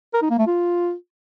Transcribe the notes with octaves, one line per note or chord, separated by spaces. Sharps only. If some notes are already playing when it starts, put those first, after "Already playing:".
A#4
D#4
A#3
A3
F4